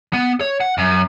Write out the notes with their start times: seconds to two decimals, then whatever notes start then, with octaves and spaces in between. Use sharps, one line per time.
0.13 B3
0.41 C#5
0.61 F#5
0.78 F#2